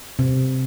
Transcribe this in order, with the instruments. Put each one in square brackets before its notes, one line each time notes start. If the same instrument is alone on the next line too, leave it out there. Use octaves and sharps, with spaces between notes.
[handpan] C3